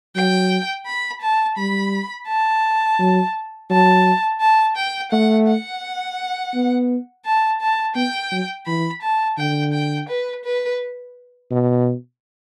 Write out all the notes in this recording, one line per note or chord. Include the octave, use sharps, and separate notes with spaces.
F#3 G5
B5
A5
G3 B5
A5
F#3
F#3 A5
A5
G5
A3 F#5
F#5
B3
A5
A5
B3 G5
F#3
E3 B5
A5
D3 G5
G5
B4
B4
B2